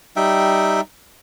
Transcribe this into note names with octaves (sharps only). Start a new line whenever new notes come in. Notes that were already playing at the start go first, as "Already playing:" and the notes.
G3 D#4 E5 G5